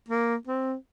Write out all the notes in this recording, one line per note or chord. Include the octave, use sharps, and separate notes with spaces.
A#3
C4